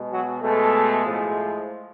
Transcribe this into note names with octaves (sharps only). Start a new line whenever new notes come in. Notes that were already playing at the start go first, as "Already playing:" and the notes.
Already playing: B2 G#3
F#3 F#4
B2 G#3 A3 A4
A2 F3 G#3